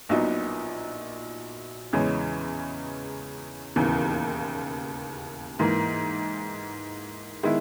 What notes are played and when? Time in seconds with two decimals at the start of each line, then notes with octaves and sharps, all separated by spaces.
0.09 A#1 A#2 F#3 B3 D#4
1.93 E2 C#3 E3 G#3 C#4
3.76 E1 D#2 C#3 E3
5.59 G#2 E3 A#3
7.43 D#3 G#3 B3 E4